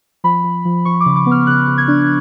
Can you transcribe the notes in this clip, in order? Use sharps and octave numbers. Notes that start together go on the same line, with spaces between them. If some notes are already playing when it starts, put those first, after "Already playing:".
F3 B5
F3
F3
F3 C#6
D6
C#3
D6
B3
F6
C#3 F#6
C#3
G#6
D4